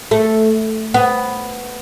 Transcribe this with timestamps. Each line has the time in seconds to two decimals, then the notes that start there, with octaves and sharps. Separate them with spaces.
0.11 A3
0.94 B3